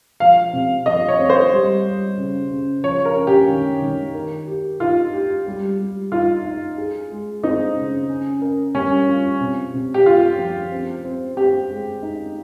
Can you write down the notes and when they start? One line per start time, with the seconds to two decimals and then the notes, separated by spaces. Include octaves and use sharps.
0.20 F3 F5
0.53 C3
0.86 F3 D#5
1.08 C#5
1.19 C4
1.30 C5
1.52 G3
1.84 G3
2.17 C#3
2.51 C#3
2.84 F3 C#5
3.05 A#4
3.16 C#4
3.27 G4
3.49 D#3
3.82 D#3
4.15 A#4
4.47 G4
4.80 D#4 F4
5.13 G4
5.47 G3
5.79 G3
6.12 D#4 F4
6.45 D#4
6.78 G#4
7.10 G#3
7.43 C4 D#4
7.76 C#3
8.09 C#4
8.42 A#4
8.74 G3 C#4
9.07 F4
9.41 C3
9.74 C3
9.94 G4
10.06 F4 G4
10.39 F3
10.72 C4
11.04 C4
11.37 C4 G4
11.70 G#3
12.02 D#4